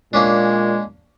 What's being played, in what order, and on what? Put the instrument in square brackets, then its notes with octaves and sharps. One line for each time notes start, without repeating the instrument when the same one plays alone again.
[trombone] A#2 [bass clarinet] G#3 [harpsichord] A#3 C#4 D4